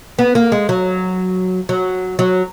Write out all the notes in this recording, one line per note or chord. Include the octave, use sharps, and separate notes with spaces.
B3
A#3
G#3
F#3
F#3
F#3